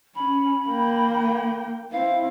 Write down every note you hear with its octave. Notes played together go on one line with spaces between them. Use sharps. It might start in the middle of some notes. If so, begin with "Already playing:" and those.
C#4 B5
A#3 G5
C4 E4 F5